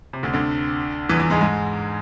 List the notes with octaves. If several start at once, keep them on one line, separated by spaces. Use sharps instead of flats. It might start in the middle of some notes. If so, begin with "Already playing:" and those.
C3
D2 D3
D2 D3
E2 E3
E2 E3
G#2 G#3
G#2 G#3